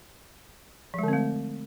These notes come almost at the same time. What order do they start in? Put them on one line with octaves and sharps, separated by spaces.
F3 G#3 D3 C4 A3